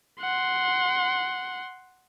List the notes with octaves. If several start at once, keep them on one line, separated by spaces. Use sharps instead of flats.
F#5 C6